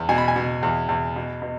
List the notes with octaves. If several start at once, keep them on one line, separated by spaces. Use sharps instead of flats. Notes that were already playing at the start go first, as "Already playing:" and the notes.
Already playing: E2
B2 G#5
B5
G#5
B2
E2
E2
B2
B2